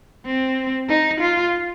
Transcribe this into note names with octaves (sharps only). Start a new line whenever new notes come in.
C4
D#4
F4